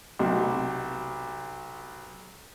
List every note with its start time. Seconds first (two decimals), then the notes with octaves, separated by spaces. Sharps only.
0.19 B1 C3